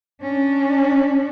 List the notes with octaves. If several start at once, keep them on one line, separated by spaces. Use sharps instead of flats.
C#4 D4